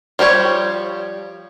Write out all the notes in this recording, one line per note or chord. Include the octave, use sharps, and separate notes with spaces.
F3 G3 G4 C#5